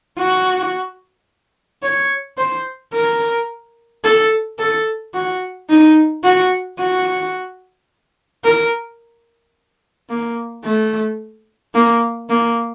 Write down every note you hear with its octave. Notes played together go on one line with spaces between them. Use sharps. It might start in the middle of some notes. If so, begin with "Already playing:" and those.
F#4
C#5
C5
A#4
A4
A4
F#4
D#4
F#4
F#4
A#4
A#3
A3
A#3
A#3